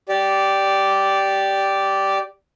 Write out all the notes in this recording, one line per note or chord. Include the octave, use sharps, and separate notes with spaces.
G4 D5